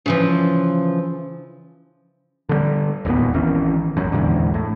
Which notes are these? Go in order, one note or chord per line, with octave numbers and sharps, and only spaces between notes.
C#3 E3 F3
D3 D#3 G3
E1 D#2 A#2 B3
G#1 D#3 E3 C#4
G#1 F#2
A#1 E2 G#2 D3
A2